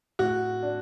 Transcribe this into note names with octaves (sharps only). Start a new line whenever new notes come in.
A2 F#4
D4